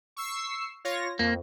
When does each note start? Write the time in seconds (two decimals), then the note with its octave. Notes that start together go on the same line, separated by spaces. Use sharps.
0.16 C#6 E6 C7
0.85 F4 C#5 A#6
1.19 F2 A#3